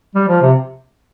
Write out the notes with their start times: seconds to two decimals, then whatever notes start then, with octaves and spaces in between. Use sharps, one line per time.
0.15 G3
0.28 F3
0.42 C3